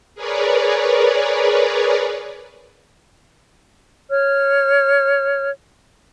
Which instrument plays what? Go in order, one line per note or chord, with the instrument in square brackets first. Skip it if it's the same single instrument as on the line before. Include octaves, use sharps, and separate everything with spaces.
[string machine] G#4 A#4 B4 C#5 D5
[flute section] C#5 F6